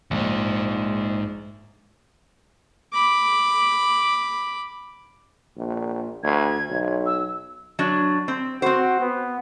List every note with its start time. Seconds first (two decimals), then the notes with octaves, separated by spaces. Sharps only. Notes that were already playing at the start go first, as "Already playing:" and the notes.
0.11 A#1 D#2 G#2
2.92 B5 D6
5.57 A#1
6.23 D2 G#6
6.69 B1
7.06 E6
7.79 F#3 D4
8.28 C4
8.62 C4 F#4 C5
9.01 B3